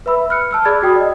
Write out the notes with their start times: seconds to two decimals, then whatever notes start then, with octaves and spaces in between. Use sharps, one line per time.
0.06 B4 E5 B5 E6
0.30 F6 F#6 C#7
0.51 A5 E6 F6
0.65 G#4 D5 B5 G#6 A6
0.82 F#4 G5 D#6
0.96 D5 D#5